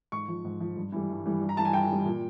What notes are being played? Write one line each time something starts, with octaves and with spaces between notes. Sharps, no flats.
G#2 C#6
F3
G#2
F3
G2
E3 G3
G2
E3 G3
G2
A#5
E3 G3 A5
G#5
G2 G5
E3 G3
A#2